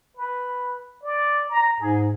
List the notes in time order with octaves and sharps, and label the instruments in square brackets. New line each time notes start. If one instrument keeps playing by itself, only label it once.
[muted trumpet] B4
D5
A#5
[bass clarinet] G#2 [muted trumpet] G#4